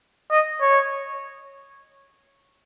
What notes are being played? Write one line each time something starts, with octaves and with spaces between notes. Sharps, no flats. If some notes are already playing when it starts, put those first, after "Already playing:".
D#5
C#5